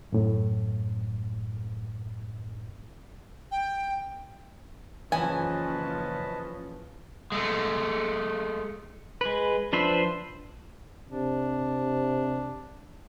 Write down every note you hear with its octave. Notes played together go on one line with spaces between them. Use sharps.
F#2 A2
G5
F#1 E3 F3 C#4 B4 D#5 G#5 A5
G#3 A3
G#3 B4
F3 D4 B4 C5 E5
C3 D4